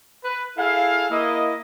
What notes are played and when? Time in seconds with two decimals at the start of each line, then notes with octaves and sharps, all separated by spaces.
0.24 B4
0.58 E4 G#4 A4 F5
1.11 A#3 E4 D#5